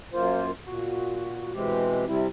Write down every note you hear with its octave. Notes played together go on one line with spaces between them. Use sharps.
F#2 A#3 F4 C5
A#2 F#4
B2 E3 G#3 C4 G4
C3 G3 C4 E4